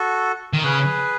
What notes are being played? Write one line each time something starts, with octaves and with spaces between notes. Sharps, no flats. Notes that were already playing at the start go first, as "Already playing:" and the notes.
Already playing: F#4 A4
D#3
C#3 G#4 B4